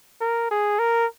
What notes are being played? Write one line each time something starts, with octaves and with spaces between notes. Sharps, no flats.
A#4
G#4
A#4